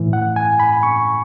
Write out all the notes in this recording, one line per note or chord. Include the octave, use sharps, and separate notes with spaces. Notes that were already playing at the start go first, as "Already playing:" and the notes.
Already playing: A2 E3
F#5
G#5
B5
C#6